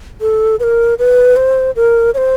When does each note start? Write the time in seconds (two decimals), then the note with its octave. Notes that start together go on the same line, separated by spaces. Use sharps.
0.21 A4
0.60 B4
0.63 A#4
0.99 B4
1.36 C5
1.76 A#4
2.14 C#5
2.18 C5